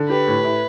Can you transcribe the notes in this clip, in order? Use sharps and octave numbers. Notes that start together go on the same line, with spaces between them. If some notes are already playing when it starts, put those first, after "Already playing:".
Already playing: D3
G4 B4
A2
E4